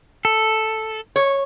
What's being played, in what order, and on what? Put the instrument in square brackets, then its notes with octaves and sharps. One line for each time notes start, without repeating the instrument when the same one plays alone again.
[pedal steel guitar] A4
[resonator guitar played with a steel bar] C#5